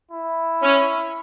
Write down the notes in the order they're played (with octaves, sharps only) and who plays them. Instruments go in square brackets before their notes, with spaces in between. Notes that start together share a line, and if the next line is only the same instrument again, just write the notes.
[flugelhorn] E4
[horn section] C#4